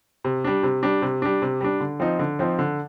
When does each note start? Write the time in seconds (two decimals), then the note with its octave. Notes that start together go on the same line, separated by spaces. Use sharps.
0.24 C3
0.44 G3 D4
0.63 C3
0.83 G3 D4
1.02 C3
1.22 G3 D4
1.42 C3
1.61 G3 D4
1.80 D3
2.00 F3 C4 D#4
2.19 D3
2.39 F3 C4 D#4
2.59 D3